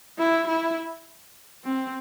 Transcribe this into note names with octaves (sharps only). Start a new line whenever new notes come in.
E4
E4
C4